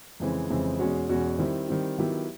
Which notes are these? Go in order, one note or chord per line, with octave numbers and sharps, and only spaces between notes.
F2 C#3 E3 G#3 C4
F2 C#3 E3 G#3 C4
E2 B2 G#3 C#4 F#4
E2 B2 G#3 C#4 F#4
D#3 G3 C4 E4
D#3 G3 C4 E4
D#3 F#3 B3 E4 G4